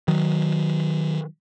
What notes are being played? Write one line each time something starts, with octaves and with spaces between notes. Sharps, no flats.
D#3 F#3